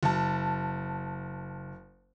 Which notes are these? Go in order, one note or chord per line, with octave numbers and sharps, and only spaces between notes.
F#1 A5